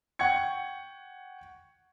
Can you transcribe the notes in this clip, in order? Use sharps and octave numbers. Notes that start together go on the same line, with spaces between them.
F#5 G5 C#6 G#6 C#7